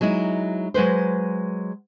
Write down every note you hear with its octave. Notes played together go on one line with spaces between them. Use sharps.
F#3 G#3 D#4 E4
F#3 G#3 B4 C5